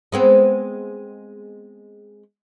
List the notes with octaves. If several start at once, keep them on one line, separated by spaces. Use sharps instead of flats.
G#3 B3 C4